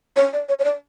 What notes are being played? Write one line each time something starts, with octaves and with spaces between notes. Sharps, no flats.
C#5
D5
C#5
C#5
D5